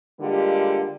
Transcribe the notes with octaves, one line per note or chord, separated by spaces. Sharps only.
D3 G3 G#3 A#3 F4 G4